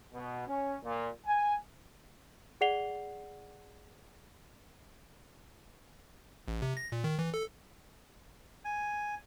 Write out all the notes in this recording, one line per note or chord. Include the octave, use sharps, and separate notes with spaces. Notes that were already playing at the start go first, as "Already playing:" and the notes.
B2
C#4
A#2
G#5
G#4 D5 F#5 C7 F7 G7
A1
C3
A#6
A#2
D#3
E3
A4
G#5